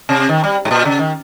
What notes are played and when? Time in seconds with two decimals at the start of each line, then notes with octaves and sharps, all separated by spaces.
0.09 C3
0.29 D#3
0.44 G3
0.65 G#2
0.71 A#2
0.85 C#3
0.99 D#3